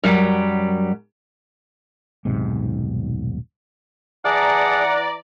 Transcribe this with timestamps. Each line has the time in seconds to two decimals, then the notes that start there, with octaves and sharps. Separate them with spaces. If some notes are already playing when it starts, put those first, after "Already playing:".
0.03 F#2 F#3 G3
2.25 D#1 B1 G#2 C3
4.25 E3 G#4 D5 F#5 A5 A#5